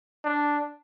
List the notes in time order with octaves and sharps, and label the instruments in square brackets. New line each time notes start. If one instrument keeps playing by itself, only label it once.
[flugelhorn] D4